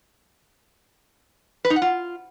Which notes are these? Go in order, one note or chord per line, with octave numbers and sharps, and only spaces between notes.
B4
D#4
F#5
F4